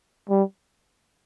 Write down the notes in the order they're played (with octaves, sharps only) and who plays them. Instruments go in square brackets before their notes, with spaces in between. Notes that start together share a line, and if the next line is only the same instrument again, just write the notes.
[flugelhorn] G3